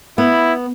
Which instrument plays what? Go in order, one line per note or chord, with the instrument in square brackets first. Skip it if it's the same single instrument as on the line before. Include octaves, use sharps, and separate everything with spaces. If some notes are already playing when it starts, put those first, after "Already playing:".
[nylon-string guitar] B3 [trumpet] E4